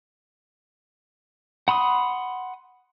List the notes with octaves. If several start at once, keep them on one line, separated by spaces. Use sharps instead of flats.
F#5 B5 C6 D#6